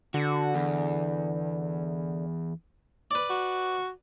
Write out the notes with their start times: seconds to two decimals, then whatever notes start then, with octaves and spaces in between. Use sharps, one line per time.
0.14 D3 F#4
0.55 E2
3.11 B4 D5
3.30 F#4